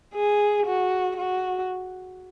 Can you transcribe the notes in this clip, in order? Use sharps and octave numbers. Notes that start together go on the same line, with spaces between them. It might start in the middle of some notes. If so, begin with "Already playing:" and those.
G#4
F#4
F#4